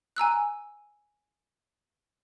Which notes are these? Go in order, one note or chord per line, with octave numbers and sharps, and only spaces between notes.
G#5 A#5 E6 F#6